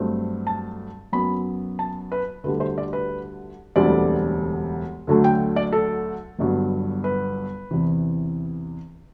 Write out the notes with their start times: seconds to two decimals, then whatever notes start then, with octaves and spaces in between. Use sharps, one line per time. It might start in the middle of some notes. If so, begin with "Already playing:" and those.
Already playing: G2 F#3 A3 C4
0.47 A5
1.12 F#2 F#3 B3 B5
1.79 A5
2.12 B4
2.44 D2 D3 G3 B4
2.60 C5
2.78 D5
2.93 B4
3.76 E1 D2 D3 G3 C4 D5
5.07 D2 D3 F#3 A3
5.24 G5
5.56 D5
5.72 A4
6.38 G1 G2 F#3 B3
7.04 B4
7.71 E2 C3 E3